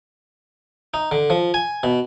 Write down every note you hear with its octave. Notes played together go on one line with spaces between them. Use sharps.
D#4
D3
F3
G#5
B2